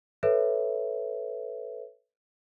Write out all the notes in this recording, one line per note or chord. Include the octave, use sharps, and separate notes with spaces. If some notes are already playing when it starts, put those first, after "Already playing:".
A4 B4 C#5 E5